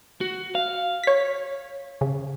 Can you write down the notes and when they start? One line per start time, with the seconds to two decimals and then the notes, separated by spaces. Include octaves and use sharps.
0.21 F#4
0.55 F5
1.04 C#5 B6
2.01 C#3